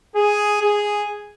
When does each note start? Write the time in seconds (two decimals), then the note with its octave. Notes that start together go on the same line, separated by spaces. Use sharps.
0.14 G#4
0.62 G#4